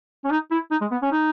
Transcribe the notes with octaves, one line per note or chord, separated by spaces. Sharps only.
C#4
D#4
E4
D#4
G#3
B3
C#4
D#4